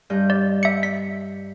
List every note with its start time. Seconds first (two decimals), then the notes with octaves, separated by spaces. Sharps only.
0.10 G2 D#5 G6
0.30 D5
0.63 E5 C#7
0.83 B6